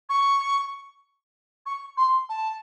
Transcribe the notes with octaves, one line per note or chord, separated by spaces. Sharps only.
C#6
C#6
C6
A5